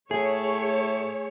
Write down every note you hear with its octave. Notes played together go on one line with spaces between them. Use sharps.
A2 A3 G#4 C#5